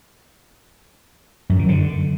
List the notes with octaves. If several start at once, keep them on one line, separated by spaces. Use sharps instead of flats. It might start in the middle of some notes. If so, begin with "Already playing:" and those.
F#2
D#3
D3